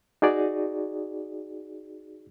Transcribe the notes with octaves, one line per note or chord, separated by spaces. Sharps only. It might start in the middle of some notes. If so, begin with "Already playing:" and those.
D#4 F#4 G#4 D5